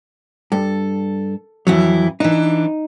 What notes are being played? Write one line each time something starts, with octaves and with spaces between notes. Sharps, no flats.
G2 A4
F2 E3 F#3 E4
E3 D4 D#4